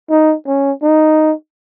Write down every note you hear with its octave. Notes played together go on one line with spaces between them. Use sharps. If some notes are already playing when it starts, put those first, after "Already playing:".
D#4
C#4
D#4